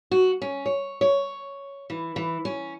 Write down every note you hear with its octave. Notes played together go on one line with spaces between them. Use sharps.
F#4
C#4
C#5
C#5
E3
E3
C#4